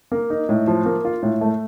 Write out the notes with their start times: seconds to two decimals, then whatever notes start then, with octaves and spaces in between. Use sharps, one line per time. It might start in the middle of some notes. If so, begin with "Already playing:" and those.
0.12 A#3
0.30 D#4
0.49 A2
0.67 F3
0.85 A#3
1.05 F4
1.23 A2
1.41 A3